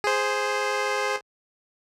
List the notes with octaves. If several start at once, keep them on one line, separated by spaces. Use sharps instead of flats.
G#4 C5